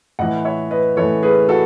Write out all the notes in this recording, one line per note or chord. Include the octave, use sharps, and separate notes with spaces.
A2 E3 D#5 F#5
C#5 E5
B4 D#5
A2 E3 A4 C#5
G#4 B4
F#4 A4